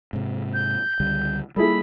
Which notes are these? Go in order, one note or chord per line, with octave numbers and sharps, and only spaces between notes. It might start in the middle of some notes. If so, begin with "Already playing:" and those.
G#2 C3
G6
C#2 D3 G3
G3 G#3 A#3 E4 G#4 A4 B5